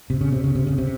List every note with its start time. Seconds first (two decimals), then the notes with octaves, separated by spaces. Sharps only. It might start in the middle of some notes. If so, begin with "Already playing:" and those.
0.10 C3
0.21 C#3
0.33 C3
0.44 C#3
0.55 C3
0.67 C#3
0.78 C3